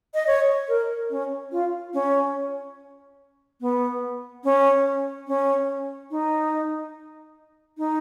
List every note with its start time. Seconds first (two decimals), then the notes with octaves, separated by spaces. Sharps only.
0.14 D#5
0.27 C#5
0.69 A#4
1.11 C#4
1.52 F4
1.94 C#4
3.61 B3
4.44 C#4
5.28 C#4
6.11 D#4
7.78 D#4